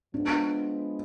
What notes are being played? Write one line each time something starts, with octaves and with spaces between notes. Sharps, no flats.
F3 G#3 B3 D4